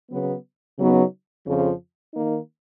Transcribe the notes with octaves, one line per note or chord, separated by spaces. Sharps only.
C#3 F#3 B3
C#3 F#3 B3 D#4
F2 C#3 F3
D#3 A#3 D#4